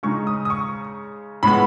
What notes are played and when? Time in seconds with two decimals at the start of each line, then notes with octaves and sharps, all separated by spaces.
0.03 C#3 G#3 D#4 C#6
0.27 D#6
0.45 D#6
0.50 C#6
1.43 A2 G#3 B3 B5